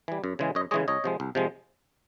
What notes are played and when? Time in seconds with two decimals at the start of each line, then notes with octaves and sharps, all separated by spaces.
0.08 E3 G3
0.24 F#2
0.39 C#3 E3 G#3
0.55 F#2 C#5 D#5
0.71 C#3 E3 G#3 C#5 D#5
0.88 C2 C#5 D#5
1.04 C3 F3 G#3
1.20 C2
1.35 C3 F3 G#3